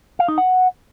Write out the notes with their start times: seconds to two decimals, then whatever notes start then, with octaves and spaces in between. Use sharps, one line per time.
0.19 F5
0.28 D#4
0.38 F#5